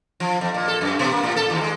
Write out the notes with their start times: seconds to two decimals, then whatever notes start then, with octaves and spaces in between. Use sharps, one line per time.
0.20 F3
0.41 F2
0.54 A#2
0.68 A4
0.81 F#2
0.99 B2
1.11 A#3
1.23 A2
1.36 A4
1.50 D#2
1.61 G#3